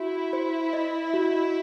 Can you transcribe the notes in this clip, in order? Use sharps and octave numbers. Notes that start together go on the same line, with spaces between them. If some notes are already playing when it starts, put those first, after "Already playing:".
Already playing: E4 F#4
C5
D#5
F#4